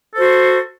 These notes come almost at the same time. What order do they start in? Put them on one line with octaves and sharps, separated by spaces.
A4 C5 F#4